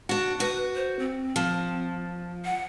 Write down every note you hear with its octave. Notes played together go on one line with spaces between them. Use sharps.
D4 F#4
F#4 B4
C5
C4
F3
F#5